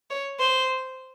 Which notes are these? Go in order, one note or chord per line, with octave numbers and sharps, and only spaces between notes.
C#5
C5